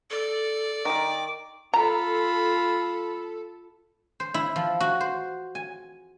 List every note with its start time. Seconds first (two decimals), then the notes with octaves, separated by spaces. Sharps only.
0.11 A4 D5
0.85 D#3 A#4 G5 D6
1.74 F4 A4 A#5 B5
4.20 C5
4.34 E4
4.56 F3
4.80 F#4
5.01 C5
5.55 G#5